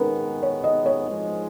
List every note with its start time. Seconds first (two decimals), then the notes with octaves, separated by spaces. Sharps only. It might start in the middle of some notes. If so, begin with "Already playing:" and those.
Already playing: G#2 D#3 G#3 B3 C#4 A#4 B4
0.43 C#5
0.64 D#5
0.86 C#5
1.07 G#2 F3 G#3